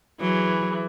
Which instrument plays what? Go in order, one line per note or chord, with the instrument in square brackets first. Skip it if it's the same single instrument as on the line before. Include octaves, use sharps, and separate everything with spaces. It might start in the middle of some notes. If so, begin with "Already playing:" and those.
[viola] E3 G#4 [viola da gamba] F#3